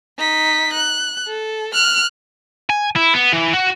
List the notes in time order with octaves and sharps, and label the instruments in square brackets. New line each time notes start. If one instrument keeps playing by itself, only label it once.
[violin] D#4 B6
F#6
A4
F6 F#6
[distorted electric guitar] G#5
E4
B3
E3
F#4